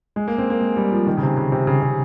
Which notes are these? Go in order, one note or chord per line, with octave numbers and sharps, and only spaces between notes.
G#3
A#3
C4
A#3
G#3
G3
F3
D#3
C#3
C3
C#3
C3
C#3
C3